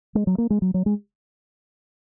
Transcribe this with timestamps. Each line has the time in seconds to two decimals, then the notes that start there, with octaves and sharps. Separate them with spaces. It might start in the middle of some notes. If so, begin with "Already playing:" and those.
0.15 G#3
0.27 F#3
0.38 A#3
0.50 G#3
0.62 F#3
0.74 F#3
0.86 G#3